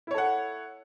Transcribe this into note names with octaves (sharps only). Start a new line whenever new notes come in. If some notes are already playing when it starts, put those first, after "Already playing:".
E4 A4 C#5 F#5